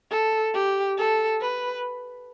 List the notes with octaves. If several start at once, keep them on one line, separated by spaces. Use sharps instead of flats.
A4
G4
A4
B4